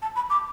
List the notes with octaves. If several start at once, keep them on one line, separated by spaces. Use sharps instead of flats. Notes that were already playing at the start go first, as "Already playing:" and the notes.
A5
B5
D6